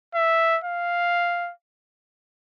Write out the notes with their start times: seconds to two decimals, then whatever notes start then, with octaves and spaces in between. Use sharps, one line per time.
0.15 E5
0.64 F5